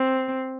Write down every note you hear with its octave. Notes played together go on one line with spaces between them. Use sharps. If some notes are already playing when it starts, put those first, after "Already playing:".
Already playing: C4